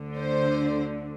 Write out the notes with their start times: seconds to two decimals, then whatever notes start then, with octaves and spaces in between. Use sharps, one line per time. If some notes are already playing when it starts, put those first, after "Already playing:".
Already playing: D2 D3
0.17 C5